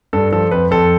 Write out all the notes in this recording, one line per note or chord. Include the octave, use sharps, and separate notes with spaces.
G2 A4
F3 A4
F2 B4
F2 A4